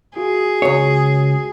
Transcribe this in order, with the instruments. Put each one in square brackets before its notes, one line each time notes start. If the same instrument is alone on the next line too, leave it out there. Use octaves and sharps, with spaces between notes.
[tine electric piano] F4 F#4 [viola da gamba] G#4
[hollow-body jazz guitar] C#2 C#5